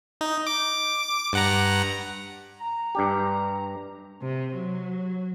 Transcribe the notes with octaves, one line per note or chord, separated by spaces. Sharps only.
D#4
D6
G2 F#5 A#5
A#5
G2 D4 G4
C3
F#3